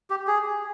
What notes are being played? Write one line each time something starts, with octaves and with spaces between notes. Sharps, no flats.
G4
G#4